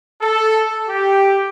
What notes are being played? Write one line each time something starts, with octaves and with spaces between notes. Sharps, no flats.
A4
G4